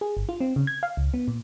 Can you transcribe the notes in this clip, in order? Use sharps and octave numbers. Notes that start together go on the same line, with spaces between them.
G#4
G1
F4
C4
C#3
G#6
F5
C#2
B3
A#2